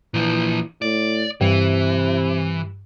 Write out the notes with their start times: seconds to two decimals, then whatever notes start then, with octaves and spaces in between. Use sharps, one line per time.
0.14 A#2 E3 F3
0.82 A2 D5
1.41 G2 C3 E3